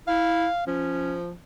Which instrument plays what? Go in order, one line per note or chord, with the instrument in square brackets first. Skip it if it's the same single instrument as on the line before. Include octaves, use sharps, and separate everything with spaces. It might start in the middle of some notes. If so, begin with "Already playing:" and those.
[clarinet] E4 [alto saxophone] F5
[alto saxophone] F3 [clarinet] C#4